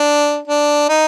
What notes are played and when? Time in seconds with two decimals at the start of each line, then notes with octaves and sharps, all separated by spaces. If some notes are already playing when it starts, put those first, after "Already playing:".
Already playing: D4
0.48 D4
0.89 D#4